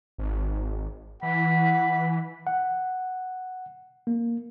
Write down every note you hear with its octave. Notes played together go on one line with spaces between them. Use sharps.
G#1
E3 F#5 B5
F#5
A#3